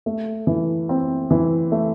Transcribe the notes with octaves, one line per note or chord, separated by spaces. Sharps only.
A3
E3
C4
E3
A3